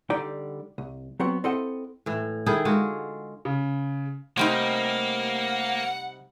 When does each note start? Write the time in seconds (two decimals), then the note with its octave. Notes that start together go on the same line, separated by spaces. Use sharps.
0.10 D3 G3 D#4 D5 G5
0.78 C2
1.19 F#3 B3 C4 F#4
1.44 C4 E4 A4 D#5 F#5 G5
2.06 A2 E3
2.46 D#3 E4 G#4 A4
2.65 D3 G#3 F4 F#4
3.45 C#3
4.37 C3 G3 A3 A#3 D#4 C5 F#5 D7